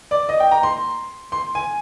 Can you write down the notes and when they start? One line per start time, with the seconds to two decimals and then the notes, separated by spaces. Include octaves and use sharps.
0.11 D5
0.29 D#5
0.40 G5
0.51 A#5
0.63 C6
1.32 C6
1.55 G#5